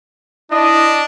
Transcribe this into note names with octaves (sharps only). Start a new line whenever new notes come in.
D4 E4 D#5